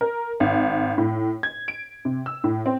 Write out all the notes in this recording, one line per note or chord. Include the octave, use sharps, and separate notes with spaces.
A#4
G#1
A2
G#6
D7
C3
E6
A2
C4